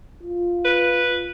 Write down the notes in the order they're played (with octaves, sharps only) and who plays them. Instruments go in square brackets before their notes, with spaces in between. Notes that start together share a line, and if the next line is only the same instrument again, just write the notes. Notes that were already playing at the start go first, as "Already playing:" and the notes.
[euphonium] F4
[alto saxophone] B4